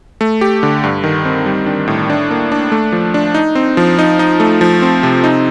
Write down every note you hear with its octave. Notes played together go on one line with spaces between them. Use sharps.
A3
G4
D3
G2
D#3
C4
G3
D4
A2
D4
A#3
D4
A3
F3
D4
D#4
C4
F3
D#4
D#4
A3
F3
C4
C3
D#4